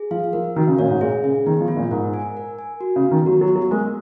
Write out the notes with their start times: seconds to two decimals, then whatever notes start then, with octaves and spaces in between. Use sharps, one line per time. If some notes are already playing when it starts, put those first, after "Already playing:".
Already playing: G#4
0.11 F3 F5
0.33 F3 A#4
0.56 D#3 F#4
0.67 C#3
0.79 A#2 C#5
0.90 G#2
1.01 A#2 G#4
1.23 C#3 G#4
1.46 D#3 B3
1.61 F3
1.68 F4
1.77 A#2
1.91 G#2 A#4
2.14 G#5
2.37 A#4
2.59 G#5
2.81 F#4
2.96 C#3
3.04 B3
3.11 D#3
3.26 F#3 F#4
3.41 F#3
3.49 B3
3.56 F#3
3.71 G#3 A#4